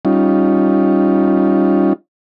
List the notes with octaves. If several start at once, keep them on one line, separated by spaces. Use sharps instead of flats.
G3 C#4 D#4 F4